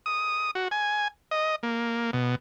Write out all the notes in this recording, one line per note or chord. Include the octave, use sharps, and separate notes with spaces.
D#6
F#4
G#5
D#5
A#3
B2